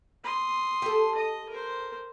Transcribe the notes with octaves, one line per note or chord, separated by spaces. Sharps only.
C6 D#6
G4 A4
D#5
A#4 C5